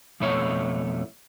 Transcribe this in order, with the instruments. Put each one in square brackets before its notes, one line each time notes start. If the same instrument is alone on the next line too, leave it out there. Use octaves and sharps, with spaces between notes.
[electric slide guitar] F2 B2 A3 E4 C#5